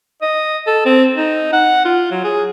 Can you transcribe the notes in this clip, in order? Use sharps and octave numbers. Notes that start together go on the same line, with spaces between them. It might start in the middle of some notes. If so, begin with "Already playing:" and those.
D#5
A4
C4
D#4
F#5
F4
F#3
G#4